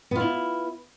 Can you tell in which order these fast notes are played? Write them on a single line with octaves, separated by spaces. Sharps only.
B3 F4 E4